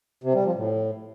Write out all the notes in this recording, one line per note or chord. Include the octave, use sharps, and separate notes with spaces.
C3
G3
F3
A2